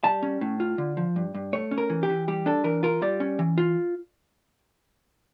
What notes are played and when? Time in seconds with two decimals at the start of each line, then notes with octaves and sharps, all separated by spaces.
0.04 G3 A5
0.23 C#4
0.41 A2
0.60 F4
0.78 D3
0.97 F3
1.16 G2
1.35 G2
1.53 A3 C#5
1.71 C#4
1.78 A#4
1.90 E3
2.03 G4
2.09 E3
2.28 G3 G4
2.46 D4 A4
2.64 E3 A#4
2.83 F4 A#4
3.02 G3 D5
3.20 C#4
3.39 E3
3.58 F4